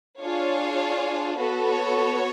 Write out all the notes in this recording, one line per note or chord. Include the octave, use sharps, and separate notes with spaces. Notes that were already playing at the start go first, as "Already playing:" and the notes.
D4 F4 G#4 C#5 F5
B3 F#4 A4 B4
C#5